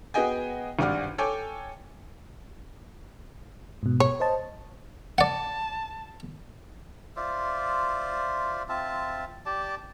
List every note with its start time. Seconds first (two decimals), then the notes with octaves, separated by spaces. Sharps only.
0.14 B3 F#4 G#4 D#5 G5 G#5
0.79 G#1 G2 D5 F#5 F6
1.18 A4 C#5 G5 G#5 D6
3.83 G#2 B2
4.00 C#5
4.20 C5 D#5 A5
5.18 D5 F#5 A5
7.16 F4 C5 D5 E5
8.69 C4 F4 E5 A5
9.46 G4 D5 A5